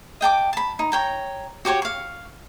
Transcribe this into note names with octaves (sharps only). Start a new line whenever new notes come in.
D#5 G5 A5 D6
A5 B5
D#4
C#5 G5 A#5
F#4 G4 C5 C#5
F5 C#6